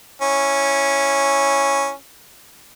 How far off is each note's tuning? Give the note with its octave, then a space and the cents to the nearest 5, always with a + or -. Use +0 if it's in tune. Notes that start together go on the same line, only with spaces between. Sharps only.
C#4 +0 E4 +0